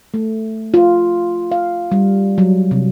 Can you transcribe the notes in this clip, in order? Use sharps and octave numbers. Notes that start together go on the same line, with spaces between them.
A3
F4
F5
G3
F#3
C3